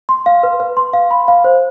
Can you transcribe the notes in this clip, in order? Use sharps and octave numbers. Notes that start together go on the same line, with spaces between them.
C6
F5
B4
B4
C6
F5
B5
F5
C5